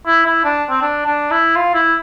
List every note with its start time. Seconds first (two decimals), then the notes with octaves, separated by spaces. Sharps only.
0.07 E4
0.25 E4
0.45 D4
0.70 C4
0.81 D4
1.06 D4
1.31 E4
1.56 F4
1.74 E4